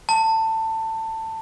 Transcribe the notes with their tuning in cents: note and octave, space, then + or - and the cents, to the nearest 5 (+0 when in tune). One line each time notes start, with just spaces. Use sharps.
A5 +20